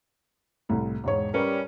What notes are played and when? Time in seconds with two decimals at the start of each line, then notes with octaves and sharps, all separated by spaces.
0.69 C2 A2
1.04 E1 G#2 C#5
1.34 G3 C#4 A#4 B4